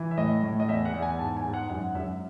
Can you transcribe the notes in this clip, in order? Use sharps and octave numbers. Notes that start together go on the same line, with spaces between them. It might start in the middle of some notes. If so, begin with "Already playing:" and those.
Already playing: E3
E5
A2 D#5
A2
D#5
E2 E5
F#5
E2
G#5
G#2 A5
G#5
G#2
F#5
F#2 F#5
F#2 E5